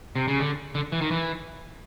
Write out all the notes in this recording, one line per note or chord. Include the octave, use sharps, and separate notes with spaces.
C3
C#3
D3
D3
E3
D#3
E3